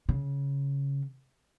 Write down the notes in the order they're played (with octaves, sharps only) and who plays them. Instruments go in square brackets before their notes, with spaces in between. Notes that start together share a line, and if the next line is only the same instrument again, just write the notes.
[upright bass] C#3